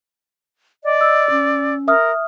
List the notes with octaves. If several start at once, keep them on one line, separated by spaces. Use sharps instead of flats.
D5 D#5
E6
C#4
A#4 E5 D#6 F6